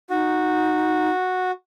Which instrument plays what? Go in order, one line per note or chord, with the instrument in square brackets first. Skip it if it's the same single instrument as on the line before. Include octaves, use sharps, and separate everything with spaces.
[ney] D#4 [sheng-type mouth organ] F#4